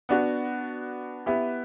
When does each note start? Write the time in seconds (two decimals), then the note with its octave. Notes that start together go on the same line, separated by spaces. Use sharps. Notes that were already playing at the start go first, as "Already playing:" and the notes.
0.09 B3 D4 F#4
1.26 B3 E4 G4 B4 E5